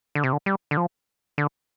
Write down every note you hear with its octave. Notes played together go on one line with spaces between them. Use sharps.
D3
C3
D3
G3
D3
F3
D3